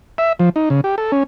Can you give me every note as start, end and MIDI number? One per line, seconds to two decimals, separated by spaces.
0.18 0.33 76
0.39 0.49 53
0.56 0.69 63
0.70 0.81 49
0.84 0.96 67
0.98 1.12 69
1.12 1.23 61